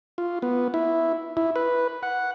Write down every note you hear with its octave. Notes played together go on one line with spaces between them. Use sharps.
F4
B3
E4
E4
B4
F#5